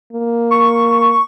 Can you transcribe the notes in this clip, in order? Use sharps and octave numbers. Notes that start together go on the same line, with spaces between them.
A#3
C#6